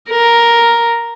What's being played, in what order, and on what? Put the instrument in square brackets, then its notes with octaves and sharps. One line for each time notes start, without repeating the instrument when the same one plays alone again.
[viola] A#4